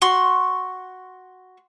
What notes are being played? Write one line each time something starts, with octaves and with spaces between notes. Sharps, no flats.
F#4 C6 C#6